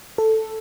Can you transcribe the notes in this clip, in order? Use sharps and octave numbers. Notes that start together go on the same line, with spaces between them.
A4